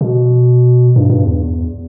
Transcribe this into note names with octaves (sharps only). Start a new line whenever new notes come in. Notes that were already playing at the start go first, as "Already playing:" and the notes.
B2
G2
G2
E2